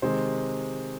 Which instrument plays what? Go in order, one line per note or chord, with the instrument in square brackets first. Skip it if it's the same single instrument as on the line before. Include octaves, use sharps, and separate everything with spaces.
[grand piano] C3 D#3 G#3 C5